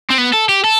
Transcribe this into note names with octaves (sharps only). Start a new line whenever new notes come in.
C4
B3
A4
G4
A4